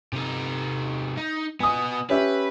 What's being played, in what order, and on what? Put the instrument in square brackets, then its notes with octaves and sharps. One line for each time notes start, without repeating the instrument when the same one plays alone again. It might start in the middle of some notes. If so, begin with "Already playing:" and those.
[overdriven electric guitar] C3 D#4
D#4
[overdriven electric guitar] B3 D#5 [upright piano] G#5 D#6
[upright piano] C#4 G4 E5 [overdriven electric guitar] B4